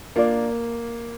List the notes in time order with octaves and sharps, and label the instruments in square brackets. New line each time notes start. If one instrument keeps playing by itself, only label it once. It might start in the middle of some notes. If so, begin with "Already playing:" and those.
[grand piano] A#3 [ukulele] D4 F4 A#4 D5